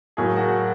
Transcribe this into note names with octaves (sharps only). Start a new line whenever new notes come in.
A2 F#3 A#3 G#4 G#5
F#4 F#5